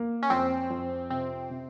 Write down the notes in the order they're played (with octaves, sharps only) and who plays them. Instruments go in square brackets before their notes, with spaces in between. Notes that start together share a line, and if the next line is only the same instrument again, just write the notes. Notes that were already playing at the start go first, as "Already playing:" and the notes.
Already playing: [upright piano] A#3
[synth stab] C#4
[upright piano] F2 [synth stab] C4
[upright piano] F2
[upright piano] C3 [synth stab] C4
[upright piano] C3